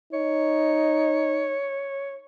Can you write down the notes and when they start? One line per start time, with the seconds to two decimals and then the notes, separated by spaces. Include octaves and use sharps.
0.13 D#4 C#5